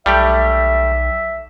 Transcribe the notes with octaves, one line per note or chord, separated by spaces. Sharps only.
B1 G3 A3 G4 E5